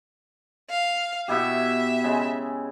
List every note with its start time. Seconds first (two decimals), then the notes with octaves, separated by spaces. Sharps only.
0.70 F5
1.28 B2 E4 G4 E5
2.04 C#3 G#3